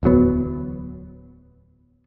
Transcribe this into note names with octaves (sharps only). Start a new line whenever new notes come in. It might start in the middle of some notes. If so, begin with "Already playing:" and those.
D1 E2 F#3 B3